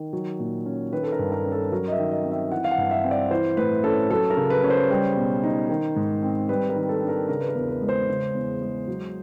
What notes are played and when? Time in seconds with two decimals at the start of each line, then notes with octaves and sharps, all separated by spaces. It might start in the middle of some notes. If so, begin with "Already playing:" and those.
Already playing: D#3
0.13 F#3
0.40 A#2
0.66 C#4
0.92 D#3 B4
1.03 A4
1.12 A#4
1.19 G2
1.32 A#4
1.46 C#4
1.52 A4
1.72 F#3 A#4
1.88 D#5
1.92 E5
1.99 D#3
2.12 D#5
2.25 C4
2.32 E5
2.51 E3 F#5
2.64 F5
2.71 F#5
2.78 G2
2.91 E5
3.05 C4
3.11 D5
3.31 E3 C5
3.57 A2 B4
3.84 C#4 A4
4.10 F#3 A4
4.30 A#4
4.37 C#3
4.50 B4
4.63 C#4
4.70 C5
4.90 G3
5.16 B2
5.43 D#4
5.70 D#3
5.96 G#2
6.23 C4
6.49 G3 B4
6.69 A#4
6.76 D#3
6.89 A4
7.02 D4
7.09 A#4
7.29 C#3 A#4
7.41 B4
7.49 A#4
7.55 E2
7.68 B4
7.82 G#3
7.89 C5
8.08 C#3
8.35 E2
8.61 G#3
8.88 F#3